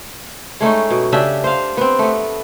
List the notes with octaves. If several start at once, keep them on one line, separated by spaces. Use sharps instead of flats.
G#3 A3 C#4 D#4
B2
C#3 D4 G4 E5
C5 F5
B3 C4
A3 B3